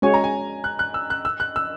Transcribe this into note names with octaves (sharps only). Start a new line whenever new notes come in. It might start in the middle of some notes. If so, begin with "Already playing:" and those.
G#3 C#4 F#4 C#5 G#5
A#5
G#5
F#6
F#6
E6
F#6
E6
F#6
E6